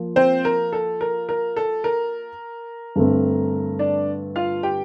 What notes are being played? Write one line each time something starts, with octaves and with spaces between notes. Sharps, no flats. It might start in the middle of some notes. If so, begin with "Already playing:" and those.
Already playing: F3 A#3 F4
C4 C5
A#4
A4
A#4
A#4
A4
A#4
G2 D3 A3 C4
D4 D5
F4 F5
G4 G5